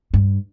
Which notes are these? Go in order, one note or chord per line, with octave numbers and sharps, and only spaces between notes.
G2